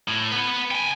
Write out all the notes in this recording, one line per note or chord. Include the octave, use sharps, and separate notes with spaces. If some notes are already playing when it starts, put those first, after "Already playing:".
A2
B4 F#5
G5 G#5